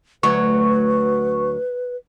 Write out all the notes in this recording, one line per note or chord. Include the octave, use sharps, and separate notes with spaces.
D2 F#3 B4 C#6